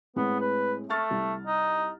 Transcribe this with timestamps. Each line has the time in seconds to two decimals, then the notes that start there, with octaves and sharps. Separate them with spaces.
0.16 A2 G#3 B3 C4
0.41 B4
0.90 A3 C#6 F6 A6
1.11 C2
1.47 D#4